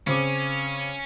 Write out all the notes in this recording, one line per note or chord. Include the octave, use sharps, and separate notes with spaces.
C#3 C4 C#4 D6